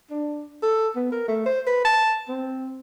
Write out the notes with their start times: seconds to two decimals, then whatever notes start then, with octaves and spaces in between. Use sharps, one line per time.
0.11 D4
0.63 A4
0.96 B3
1.12 A#4
1.28 A3
1.46 C5
1.67 B4
1.85 A5
2.29 C4